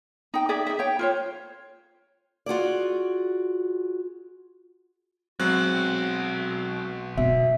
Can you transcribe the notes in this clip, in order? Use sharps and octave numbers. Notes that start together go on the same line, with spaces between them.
D#4 G5
G#4 D5 E5
D#4 E5
C#5 G5
F4 C5 C#5
F4 F#4 G#4 D5
B1 F#3 G#3 C4 F#4 F#6
B2 E5